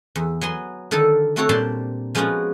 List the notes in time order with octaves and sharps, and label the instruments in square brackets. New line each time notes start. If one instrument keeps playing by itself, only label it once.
[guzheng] E2
F#3 B3 G#5 C6
D3 D#3 A4 A#4 A5
A3 C4 F#4 A4 C#5
A#2 G3 D4 C5 A5 C6
F3 G#3 B3 C#4 F4 F#4